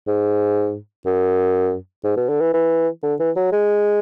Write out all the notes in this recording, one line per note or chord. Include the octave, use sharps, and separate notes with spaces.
G#2
F#2
G#2
B2
D3
E3
E3
D3
E3
F#3
G#3